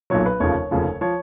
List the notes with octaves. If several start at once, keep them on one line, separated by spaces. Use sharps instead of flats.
B1 A#2 F#3 C#5
B4
F1 D#2 C#3 F3 C#5
F1 D#2 C#3 F3
F3 C#5